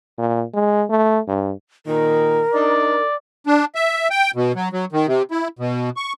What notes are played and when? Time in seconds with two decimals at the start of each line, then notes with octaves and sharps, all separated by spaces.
0.18 A#2
0.54 G#3
0.90 A3
1.28 G2
1.86 A#2 D#3 A#4
2.54 D4 D#4 D5
3.47 D4
3.75 E5
4.11 G5
4.35 B2
4.55 F#3
4.73 F#3
4.92 D#3
5.07 C3
5.31 E4
5.59 B2
5.97 C#6